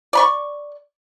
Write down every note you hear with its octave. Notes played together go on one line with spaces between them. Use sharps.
D5 B5 C#6